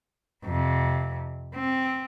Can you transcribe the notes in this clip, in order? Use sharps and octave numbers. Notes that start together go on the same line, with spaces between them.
F2 C3
C4